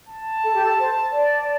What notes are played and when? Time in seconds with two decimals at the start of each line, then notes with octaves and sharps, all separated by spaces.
0.09 A5
0.44 A4
0.54 G4
0.64 A4
0.79 C5
1.14 D5